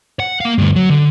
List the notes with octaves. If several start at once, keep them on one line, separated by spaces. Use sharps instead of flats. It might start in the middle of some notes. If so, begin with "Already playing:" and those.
F#5
A#3 F5
D2 G2
F#3
D3